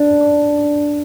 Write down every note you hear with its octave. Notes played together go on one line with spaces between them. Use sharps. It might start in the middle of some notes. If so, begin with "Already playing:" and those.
Already playing: D4